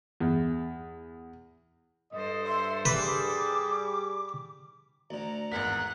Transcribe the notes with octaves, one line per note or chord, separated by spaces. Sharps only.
E2
G2 A4 C5 D#5
E5 C6
G3 G#4 B4 D6
D2 D3 A#5
G#1 E2 A#4 F#5 B6